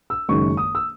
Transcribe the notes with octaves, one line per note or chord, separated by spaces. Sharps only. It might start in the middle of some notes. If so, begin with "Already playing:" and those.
E6
F#1 F#2 D#3 G#3 C#6
D#6
E6